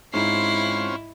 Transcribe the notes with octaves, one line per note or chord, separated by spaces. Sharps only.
G#2 C4 C#4 E4 F4 C7